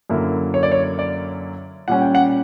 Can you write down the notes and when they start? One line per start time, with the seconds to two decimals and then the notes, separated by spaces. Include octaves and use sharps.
0.10 F#2 D3 A#3 E4
0.54 C#5
0.63 D5
0.72 C#5
0.99 D5
1.88 A#2 G3 C#4 F#5
2.01 G5
2.15 F#5